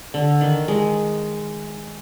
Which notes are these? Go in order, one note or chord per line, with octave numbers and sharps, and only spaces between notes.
D3
D#3
G#3